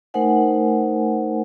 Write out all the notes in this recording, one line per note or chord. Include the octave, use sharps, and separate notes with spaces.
A3 D#4 A#4 C5 F#5 G#5